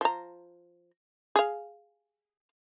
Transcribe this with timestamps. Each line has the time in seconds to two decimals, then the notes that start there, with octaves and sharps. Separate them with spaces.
0.01 F3 A#5
1.36 G#4 F5